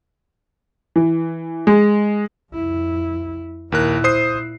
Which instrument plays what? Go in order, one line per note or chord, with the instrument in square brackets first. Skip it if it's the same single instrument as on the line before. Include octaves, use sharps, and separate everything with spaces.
[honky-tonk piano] E3
G#3
[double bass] F2 E4
[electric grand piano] D#2 A#4 F#6 [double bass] A#2 E4
[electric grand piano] C5 D#6 C7